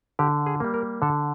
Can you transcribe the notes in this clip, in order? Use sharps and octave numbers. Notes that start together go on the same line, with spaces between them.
D3 G4
G#4
G3 A#3
A#4
D3 A4